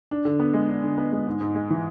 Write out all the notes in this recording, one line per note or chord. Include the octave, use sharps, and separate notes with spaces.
D4
D3
B3
G#3
D4
D3
B3
G#3
G#2
G#2
G#3
E3